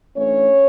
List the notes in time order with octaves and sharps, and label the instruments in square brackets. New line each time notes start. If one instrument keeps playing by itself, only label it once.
[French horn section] E3 A3 C#4 D4 C#5